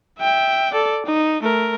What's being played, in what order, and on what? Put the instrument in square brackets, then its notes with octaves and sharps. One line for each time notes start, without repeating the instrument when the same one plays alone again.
[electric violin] E5 G5
A4 D5
D#4
A3 A#4